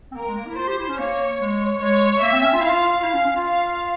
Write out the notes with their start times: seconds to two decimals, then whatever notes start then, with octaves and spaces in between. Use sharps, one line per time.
0.11 C4
0.16 A#3 A#4
0.27 G#3
0.37 A#3
0.47 E4
0.57 F4 C5
0.67 G4
0.78 E4
0.89 C#4
0.98 A#3 C#5
1.40 G#3
1.81 G#3 C#5
2.22 A#3 E5
2.33 C4
2.43 C#4
2.53 F4
2.61 E4 F5
2.70 F4
3.00 F4
3.04 E4 F5
3.14 C#4
3.25 C#4
3.36 F4
3.46 F5